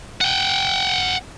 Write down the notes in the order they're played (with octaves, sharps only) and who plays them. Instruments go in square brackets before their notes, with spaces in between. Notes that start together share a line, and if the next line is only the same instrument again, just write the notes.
[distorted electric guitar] F#5 G5